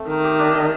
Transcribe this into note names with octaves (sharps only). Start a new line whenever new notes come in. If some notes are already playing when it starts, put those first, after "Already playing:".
Already playing: A3 C4
D#3 A#4
G4
D4
D#5